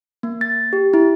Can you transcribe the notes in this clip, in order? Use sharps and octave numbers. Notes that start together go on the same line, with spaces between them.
A#3
A6
G4
E4